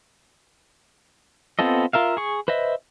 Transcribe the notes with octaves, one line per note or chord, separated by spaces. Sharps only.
B3 C4 F4 A4 D#5
F4 A#4 E5 F5
G#4 C#6
B4 C5 D#5 E5